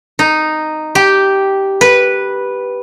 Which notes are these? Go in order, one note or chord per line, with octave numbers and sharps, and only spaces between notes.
D#4
G4
B4